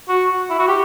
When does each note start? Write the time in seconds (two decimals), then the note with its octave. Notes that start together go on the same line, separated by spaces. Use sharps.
0.08 F#4
0.50 E4
0.59 F#4
0.68 G4